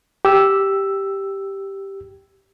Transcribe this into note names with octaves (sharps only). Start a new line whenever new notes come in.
G4 E6